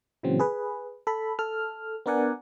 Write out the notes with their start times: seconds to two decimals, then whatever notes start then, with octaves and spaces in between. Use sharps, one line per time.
0.23 A#2 C#3 E3 F#3 C4
0.39 G#4 B4
1.07 A4 B5
1.39 A4 F6
2.06 B3 D4 A#4 D5 F#5 G#5